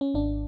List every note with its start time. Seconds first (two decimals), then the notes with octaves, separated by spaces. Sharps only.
0.01 C#4
0.14 G#1 D4